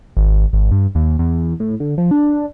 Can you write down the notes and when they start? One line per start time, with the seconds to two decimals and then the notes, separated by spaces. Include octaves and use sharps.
0.17 G#1
0.53 G#1
0.72 G2
0.95 D#2
1.19 E2
1.60 A2
1.80 D3
1.98 F3
2.11 D4